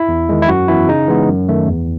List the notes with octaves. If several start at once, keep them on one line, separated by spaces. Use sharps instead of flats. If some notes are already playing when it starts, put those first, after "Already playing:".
Already playing: E4
E2
D#3 G#3
E4
F#2 F#4
E3 B3 E4
C#3 D#4
E3 G#3 B3
F#2
D#3 A3
E2